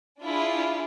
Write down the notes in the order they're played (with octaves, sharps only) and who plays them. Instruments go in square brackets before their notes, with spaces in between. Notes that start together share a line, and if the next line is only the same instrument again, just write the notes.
[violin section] D4 E4 F4 G#4